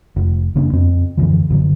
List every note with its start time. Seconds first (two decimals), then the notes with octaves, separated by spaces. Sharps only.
0.16 F1
0.55 F#1 C#3 A#3 D4
0.73 F2 C4
1.17 F#2 D3 E3 F3
1.50 F#1 D3 F#3